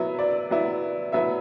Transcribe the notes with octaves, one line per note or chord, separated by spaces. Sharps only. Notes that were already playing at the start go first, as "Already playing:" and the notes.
Already playing: F#3 B3 E4 E5
D5
F#3 B3 E4
F#3 B3 E4 E5